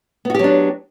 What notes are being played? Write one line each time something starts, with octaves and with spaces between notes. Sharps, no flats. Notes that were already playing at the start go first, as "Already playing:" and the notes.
F#3 B3 D4 F#4 G4